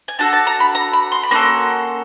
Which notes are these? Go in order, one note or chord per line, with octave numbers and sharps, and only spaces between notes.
G#5
D4 F#4 A4 A5
A5
A#5
B5
A#5
B5
C6
B5
A#3 C#4 F#4 A4 C6